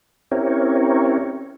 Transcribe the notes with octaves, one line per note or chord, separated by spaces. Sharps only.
C4 C#4 E4 G4 A#4 C#5